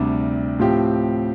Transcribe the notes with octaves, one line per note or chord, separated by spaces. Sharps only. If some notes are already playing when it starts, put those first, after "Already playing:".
Already playing: D2 C3 G3 D4
A2 F3 C4 G4